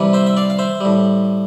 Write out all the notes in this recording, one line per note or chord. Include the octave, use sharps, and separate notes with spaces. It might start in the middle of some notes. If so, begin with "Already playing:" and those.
Already playing: C3 E3 G3
C5 E5
E5
D5 F5
F5
C5 E5
A2 G3